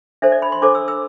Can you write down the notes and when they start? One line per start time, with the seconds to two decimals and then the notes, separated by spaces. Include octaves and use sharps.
0.22 D4 A4 C5 E5
0.32 D5
0.42 B5
0.52 C6
0.62 D4 A4 C5 D6
0.75 E6
0.88 E6